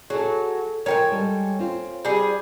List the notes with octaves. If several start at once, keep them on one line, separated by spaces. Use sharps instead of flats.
F#3 G#4 A4
F3 A#4 C#5 G5 G#5
G3 G#3 A4
C4 F4
G3 G#4